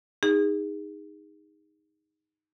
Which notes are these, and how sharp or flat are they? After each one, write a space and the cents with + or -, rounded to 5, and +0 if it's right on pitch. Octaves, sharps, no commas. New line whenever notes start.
D#4 +5 G#4 -30